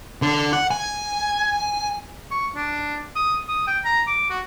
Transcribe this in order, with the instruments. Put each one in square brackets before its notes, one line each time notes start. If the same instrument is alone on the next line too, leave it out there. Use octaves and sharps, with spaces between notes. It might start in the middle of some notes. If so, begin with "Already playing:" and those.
[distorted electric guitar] D3
F#5
G#5
[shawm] C#6
D4
D#6
D#6
G5
A#5
D6
F#4